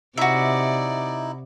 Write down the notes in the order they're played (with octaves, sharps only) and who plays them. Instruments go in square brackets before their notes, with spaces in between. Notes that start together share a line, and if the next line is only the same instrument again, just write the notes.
[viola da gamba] C3 D5 [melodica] D#4 E4 [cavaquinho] F#4 E5